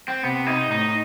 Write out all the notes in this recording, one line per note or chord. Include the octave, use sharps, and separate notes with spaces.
C4
C3 B3
D#4
A2 D#4